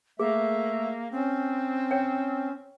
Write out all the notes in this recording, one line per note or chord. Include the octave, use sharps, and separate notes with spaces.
A3 A#3 G#4 E5
C4 C#4
C#5 F#5 G5